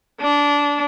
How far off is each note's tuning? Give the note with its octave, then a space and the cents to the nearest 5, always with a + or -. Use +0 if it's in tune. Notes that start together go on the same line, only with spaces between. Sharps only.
D4 -20